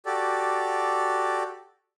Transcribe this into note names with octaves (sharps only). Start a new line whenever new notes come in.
F#4 G4 A4 D5